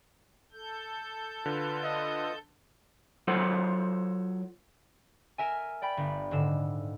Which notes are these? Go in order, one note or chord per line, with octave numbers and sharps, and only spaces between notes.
A4 G6
D3 F4 B4
D#5
F#3 F4 A4 C5 C#5 F#5
A#4 E5 G#5
D5 G5 B5 B6
G1
D#1 G#2 D3 E6 E7